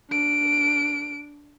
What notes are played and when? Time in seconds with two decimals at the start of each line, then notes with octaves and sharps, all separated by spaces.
0.11 D4 D7